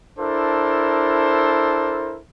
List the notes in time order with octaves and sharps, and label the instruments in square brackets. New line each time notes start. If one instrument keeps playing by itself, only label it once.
[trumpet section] D4 E4 A4 A#4 C5